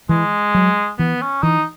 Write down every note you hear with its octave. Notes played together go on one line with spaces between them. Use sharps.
E3 G#3
F#3
E3 B3
C#4
E3 D#4